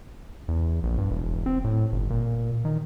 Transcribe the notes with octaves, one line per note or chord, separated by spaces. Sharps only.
E2
A#1
G2
E1
C4
A2
G1
A#2
D#3